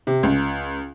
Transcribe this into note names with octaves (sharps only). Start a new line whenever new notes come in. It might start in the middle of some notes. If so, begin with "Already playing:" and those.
C3
C#2